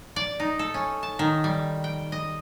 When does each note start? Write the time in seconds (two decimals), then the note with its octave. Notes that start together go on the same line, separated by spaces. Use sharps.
0.16 D5
0.40 D#4
0.59 A4
0.74 C#4
1.03 A5
1.19 D#3
1.44 G3
1.84 G5
2.12 D#5